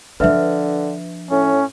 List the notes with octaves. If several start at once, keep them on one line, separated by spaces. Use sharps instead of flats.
D3 F3 D4 B4 E5
A2 C#4